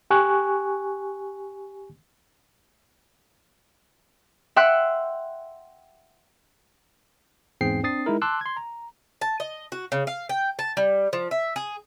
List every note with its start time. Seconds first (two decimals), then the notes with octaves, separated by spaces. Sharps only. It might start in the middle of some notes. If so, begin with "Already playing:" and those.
0.10 G4 G#5 C#6 F#6
4.56 E5 F#5 G5 C6 E6 F#6
7.61 E2 G#2 C4 G#4 G5 C7
7.83 C4 D4 D#6 A6 C7
8.06 G#3 D#4 E4 A#4
8.22 A5 C6 D6 E6 F#6
8.41 C6 G#6
8.57 A#5
9.21 A5
9.40 D#5
9.72 F#4
9.92 C#3
10.07 F5
10.29 G5
10.59 A5
10.77 G3
11.13 F3
11.31 E5
11.56 G#4